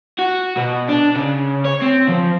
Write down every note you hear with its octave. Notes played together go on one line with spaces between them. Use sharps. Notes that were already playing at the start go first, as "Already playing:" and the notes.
F#4
B2
D4
C#3
C#5
C4
F3